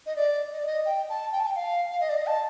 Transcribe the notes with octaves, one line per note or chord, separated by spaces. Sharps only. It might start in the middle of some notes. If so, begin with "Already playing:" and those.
D#5
D5
D#5
D5
D#5
G5
A5
G5
A5
G5
F5
F5
D#5
D5
D#5
A5